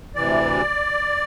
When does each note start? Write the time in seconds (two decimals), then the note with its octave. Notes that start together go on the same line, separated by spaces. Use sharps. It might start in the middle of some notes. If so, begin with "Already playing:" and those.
0.15 D2 C3 E3 D5